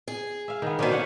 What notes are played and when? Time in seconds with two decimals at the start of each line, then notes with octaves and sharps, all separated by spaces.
0.08 G#4
0.48 E5 F5
0.62 D#3 B3
0.79 B2 D3 A#3 C#4 C5
0.91 C#4 F5 F#5